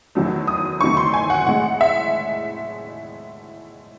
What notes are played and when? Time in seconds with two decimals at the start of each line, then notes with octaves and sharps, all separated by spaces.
0.15 E2 D#3 F#3 A3
0.47 D#6
0.81 E2 D#3 F#3 A3 C#6
0.97 C6
1.14 G#5
1.30 F#5
1.46 A2 G#3 F#5
1.81 E5